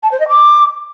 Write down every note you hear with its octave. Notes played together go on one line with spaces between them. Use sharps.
A5
C5
D#5
D6